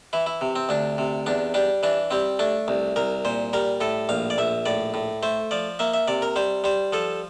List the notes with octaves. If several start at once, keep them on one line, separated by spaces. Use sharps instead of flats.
E3 E4
E4
C3
C4
D2 D4
C3
E2 D4
G3 D4
E3 D4
G3 C4
A3 D4
C2
C2 A#4
A#2 C5
G3 A#4
A2 A4
A#1 F5
D5
A#1 E5
A2 D5
A2
A3 C5
F3 D5
A#3 E5
E5
C3 D5
A#4
G3 C5
G3 C5
F3 A4